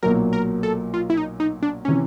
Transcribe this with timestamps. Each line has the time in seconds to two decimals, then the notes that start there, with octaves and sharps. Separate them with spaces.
0.03 B1 A#2 F#3 A#3 A#4
0.33 A#4
0.63 A4
0.94 F4
1.10 E4
1.17 D#4
1.40 D#4
1.63 D4
1.85 C3 E3 C#4